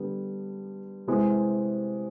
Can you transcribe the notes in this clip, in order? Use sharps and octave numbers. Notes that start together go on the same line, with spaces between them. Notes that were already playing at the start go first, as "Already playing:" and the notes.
Already playing: D3 G3 B3
C3 E3 G#3